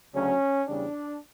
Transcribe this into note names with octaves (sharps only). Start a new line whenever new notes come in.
D2 C#3 F#3 C#4
E2 C#3 G3 D4